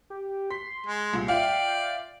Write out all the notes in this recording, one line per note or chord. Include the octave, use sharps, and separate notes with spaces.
G4
C6 B6
G#3
C2 A#2
F4 D5 E5 F5 G5